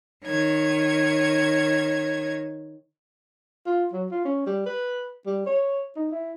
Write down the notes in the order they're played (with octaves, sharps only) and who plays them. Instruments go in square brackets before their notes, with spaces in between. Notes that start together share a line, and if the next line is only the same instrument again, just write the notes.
[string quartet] D#3 C#5 G#6
[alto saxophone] F4
F#3
F4
C#4
G3
B4
G3
C#5
D#4
E4